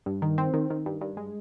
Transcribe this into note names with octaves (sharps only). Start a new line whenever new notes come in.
G2
D#3
C4
D#3
D#3
G2
G2
G#3